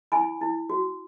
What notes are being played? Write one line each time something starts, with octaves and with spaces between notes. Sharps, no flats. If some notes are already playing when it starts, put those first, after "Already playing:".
E4 G#5 B5
E4
F#4